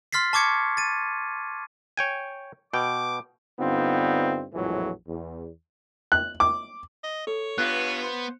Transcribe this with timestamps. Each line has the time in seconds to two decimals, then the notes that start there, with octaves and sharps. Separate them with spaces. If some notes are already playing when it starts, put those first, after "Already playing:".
0.12 C6 F6 A6 B6 C7
0.33 A5 C#6 D6 G#6 C#7
0.77 A6 D#7
1.97 C#5 G5 G#5
2.73 B2 G5 D6
3.59 G2 D3 B3 C4 D#4 F4
4.53 A#1 F2 A2 E3 F#3 G#3
5.07 E2
6.12 F#6
6.40 D6
7.04 D#5
7.27 A4 C#5
7.58 G2 B3 F4 F#6
8.03 C5